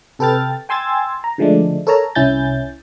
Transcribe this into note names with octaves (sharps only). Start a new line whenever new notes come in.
C3 A4 B4 G5 F6 A6
G5 G#5 C6 E6 G#6 A6
A#5
D3 F3 G#3 A3 D4
A4 A#4 C#5 A5 A#5
C2 C#4 E4 G#5 G6 A6